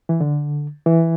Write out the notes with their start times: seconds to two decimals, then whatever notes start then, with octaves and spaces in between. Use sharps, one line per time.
0.09 E3
0.20 D3
0.86 E3